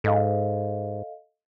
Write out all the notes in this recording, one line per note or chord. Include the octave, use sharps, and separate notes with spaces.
G#2 A4 D#5 F5